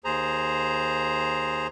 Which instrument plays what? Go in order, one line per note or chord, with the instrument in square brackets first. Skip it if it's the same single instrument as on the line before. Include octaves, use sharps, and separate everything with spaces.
[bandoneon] D#2 G#4 C5 A#5